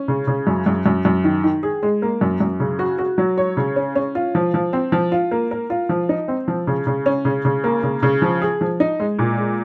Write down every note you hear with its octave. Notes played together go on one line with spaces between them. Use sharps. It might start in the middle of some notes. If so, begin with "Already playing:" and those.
Already playing: C#4
C#3
C#3
F#2
F#2
F#2
F#2
D#3
D#3
G#4
G#3
A#3
F#2
F#2
C#3
F#4
F#4
F#3
C#5
C#3
C#4
C#4
F4
F3
F3
C4
F3
F4
A#3
A#4
F4
F3
D#4
C4
F3
C#3
C#3
C#4
C#3
C#3
A#3
C#3
C#3
F3
G#4
F3
D#4
G#3
A#2
G#3